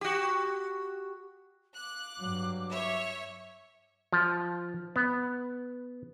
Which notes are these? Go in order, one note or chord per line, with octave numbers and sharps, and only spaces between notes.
F#4 G4
F5 D6 F#6
G2 F#3
C#5 E5
F3
B3